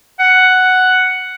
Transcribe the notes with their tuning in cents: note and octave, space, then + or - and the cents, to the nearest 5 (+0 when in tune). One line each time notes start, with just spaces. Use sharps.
F#5 +5